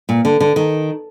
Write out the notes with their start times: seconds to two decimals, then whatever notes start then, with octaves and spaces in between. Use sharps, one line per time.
0.09 A#2
0.25 D3
0.40 D3
0.56 D#3